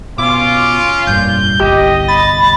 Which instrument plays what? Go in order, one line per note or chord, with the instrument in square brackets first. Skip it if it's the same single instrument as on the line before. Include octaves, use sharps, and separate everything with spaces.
[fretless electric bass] B2 [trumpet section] C#4 F4 [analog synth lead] D6
[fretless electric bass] F1 G2 A#2 [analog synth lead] G6
[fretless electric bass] G1 C2 [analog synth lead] G4 [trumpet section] D#5
[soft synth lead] B5 [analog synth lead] A6